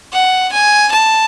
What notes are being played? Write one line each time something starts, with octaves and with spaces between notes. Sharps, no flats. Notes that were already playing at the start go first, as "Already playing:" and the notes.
F#5
G#5
A5